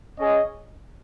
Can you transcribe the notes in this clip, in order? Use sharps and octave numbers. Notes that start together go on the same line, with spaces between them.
C#4 G#4 D#5